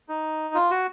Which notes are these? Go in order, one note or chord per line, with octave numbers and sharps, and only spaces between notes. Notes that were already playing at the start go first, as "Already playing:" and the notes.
D#4
F4
F#4